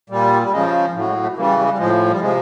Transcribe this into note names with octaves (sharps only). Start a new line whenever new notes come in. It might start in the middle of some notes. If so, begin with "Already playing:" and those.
A#2 G3
G3
C#3 F3 G#3
A2 F#3
G#3
A3
C#3 E3 G3 A#3
G3
G#3
G3
A2 F3 G#3
G3
C3 F3 G#3